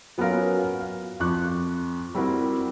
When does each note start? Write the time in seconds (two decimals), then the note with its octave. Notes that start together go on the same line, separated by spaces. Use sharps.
0.18 F#3 B3 C#4 F4 A#4 F5
0.80 F5
1.20 F2 F3 C#6 D6 F#6
2.15 G3 C4 E4 F#4 A#4